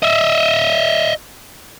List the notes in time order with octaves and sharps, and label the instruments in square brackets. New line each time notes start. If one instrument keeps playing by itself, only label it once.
[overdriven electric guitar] D#5 E5